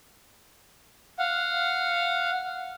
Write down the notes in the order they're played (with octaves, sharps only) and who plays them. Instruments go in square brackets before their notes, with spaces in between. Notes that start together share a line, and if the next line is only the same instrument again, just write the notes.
[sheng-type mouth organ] F5 F#5